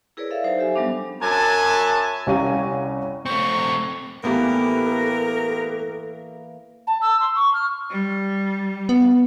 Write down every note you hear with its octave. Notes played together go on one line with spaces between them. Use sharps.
E4 G#4 A#4 B4 C#5 D5
A4 E5 F5
F#3 D#4 C5
G4 A4 E5 G#5
F#3 G3 B3 D4
F#2 E5 G#5 A5
C2 C#4 G4 F5 A#5 D#7
A3 C4 C#6
A2 E3 A#3 B3 G4 A4 A#4 B5
A5
E6
C6
C#6
F6
G3
B3